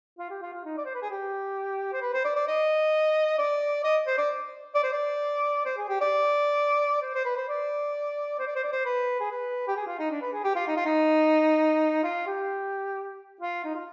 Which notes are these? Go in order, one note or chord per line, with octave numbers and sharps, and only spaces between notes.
F4
G4
F4
F4
D#4
D5
C5
B4
G#4
G4
C5
B4
C5
D5
D5
D#5
D5
D#5
C5
D5
D5
C5
D5
C5
G#4
G4
D5
C5
C5
B4
C5
D5
C5
D5
C5
D5
C5
B4
G#4
B4
G4
G#4
F4
D#4
D4
B4
G#4
G4
F4
D#4
F4
D#4
F4
G4
F4
D#4
F4